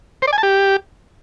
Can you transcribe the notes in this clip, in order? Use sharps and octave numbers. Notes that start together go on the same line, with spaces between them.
C5
D5
G#5
A5
G4